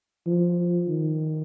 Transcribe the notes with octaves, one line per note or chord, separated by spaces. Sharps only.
F3
D#3